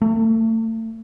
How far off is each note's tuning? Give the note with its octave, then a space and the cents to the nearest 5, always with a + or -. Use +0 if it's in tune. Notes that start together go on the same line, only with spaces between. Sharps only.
A3 +35